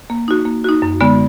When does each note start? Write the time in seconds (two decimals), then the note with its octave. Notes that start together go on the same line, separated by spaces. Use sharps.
0.10 A#3
0.28 D#4 F#4
0.45 A#3
0.64 D#4 F#4
0.82 F#2
1.01 D3 G#3 B3